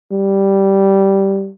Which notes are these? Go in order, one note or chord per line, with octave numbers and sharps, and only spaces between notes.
G3